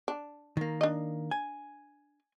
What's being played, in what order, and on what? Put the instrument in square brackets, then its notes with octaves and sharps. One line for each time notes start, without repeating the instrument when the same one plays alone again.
[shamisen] D4
[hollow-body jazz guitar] D#3 A#3
[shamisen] D4 D#5
[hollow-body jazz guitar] G#5